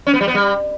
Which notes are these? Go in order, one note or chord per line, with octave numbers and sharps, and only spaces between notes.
C#4
B3
G3
B3
G3